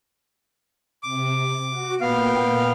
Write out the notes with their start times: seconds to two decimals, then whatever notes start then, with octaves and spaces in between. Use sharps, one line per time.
1.03 C3 D6
1.70 F#4
2.01 A#2 B3 F5 G5